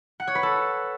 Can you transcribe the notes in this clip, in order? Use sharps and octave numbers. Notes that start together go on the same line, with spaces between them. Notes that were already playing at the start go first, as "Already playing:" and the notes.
F#5
C#5
B4
A4